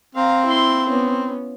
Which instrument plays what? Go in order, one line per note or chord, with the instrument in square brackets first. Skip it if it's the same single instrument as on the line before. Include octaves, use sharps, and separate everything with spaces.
[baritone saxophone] C4 [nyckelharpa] F5 A#5
[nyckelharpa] E4 C6
B3 C#4